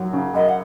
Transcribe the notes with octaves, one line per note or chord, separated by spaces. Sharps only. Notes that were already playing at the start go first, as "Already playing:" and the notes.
Already playing: F#2 F#3
C#3
F#2 D#5
F#5